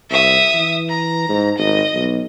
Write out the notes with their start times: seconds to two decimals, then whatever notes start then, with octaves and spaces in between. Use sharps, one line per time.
0.10 C2 E5 D#6
0.54 E3
0.89 A#5
1.29 G#2
1.58 G#1 D#5
1.94 B1